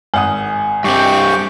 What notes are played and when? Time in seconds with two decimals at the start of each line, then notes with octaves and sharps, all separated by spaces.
0.14 G#1 F#5 G#5 D#6
0.84 G2 C4 G4 C#6 D6